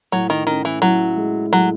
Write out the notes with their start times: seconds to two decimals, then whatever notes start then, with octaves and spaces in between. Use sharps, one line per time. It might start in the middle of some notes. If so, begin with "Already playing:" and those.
0.12 A2 F#3
0.30 D#3
0.47 D#3 C#4
0.65 E3
0.82 F#3 E4
1.17 G#3
1.52 A2 F#3